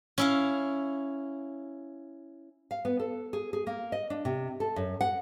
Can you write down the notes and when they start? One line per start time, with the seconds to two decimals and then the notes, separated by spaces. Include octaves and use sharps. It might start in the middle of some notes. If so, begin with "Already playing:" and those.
0.18 C#4 E4 F5
2.71 F5
2.85 B3
3.00 A4
3.33 G#4
3.53 G#4
3.67 A#3
3.92 D#5
4.10 D4
4.25 C3
4.60 A4
4.76 F#2
5.01 F#5